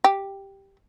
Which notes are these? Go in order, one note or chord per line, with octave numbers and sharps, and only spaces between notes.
G4